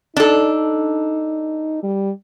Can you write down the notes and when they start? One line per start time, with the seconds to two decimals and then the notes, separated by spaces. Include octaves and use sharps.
0.17 D4 D#4 A4
1.83 G3